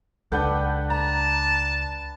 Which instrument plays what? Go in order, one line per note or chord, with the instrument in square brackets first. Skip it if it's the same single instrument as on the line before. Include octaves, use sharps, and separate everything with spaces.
[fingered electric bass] C#2 [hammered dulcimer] D4 B4 G5 [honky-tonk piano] A4 F#5 G6
[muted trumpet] A5 [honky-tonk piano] A#5